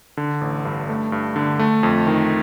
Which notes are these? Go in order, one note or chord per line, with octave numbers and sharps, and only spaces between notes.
D3
A1
G2
A3
G2
D3
A3
F2
D#3